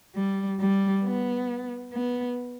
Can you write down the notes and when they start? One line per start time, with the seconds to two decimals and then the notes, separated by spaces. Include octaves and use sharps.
0.16 G3
0.60 G3
1.05 B3
1.94 B3